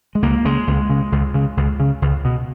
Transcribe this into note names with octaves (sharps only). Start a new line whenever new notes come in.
G#3
C#2 A#3
C#3 G#3
C#2
C#3
C#2
C#3
C#2
C#3
C#2
B2